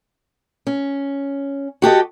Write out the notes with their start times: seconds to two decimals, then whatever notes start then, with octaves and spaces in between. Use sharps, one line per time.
0.67 C#4
1.82 F#4 G4 A4 D#5